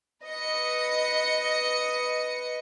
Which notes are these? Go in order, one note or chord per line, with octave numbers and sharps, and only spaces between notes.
B4 D#5 C#7